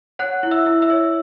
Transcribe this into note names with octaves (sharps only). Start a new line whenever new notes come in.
C#5 F#5 F#6
E4
E5 E6
E4
E5 E6
C#5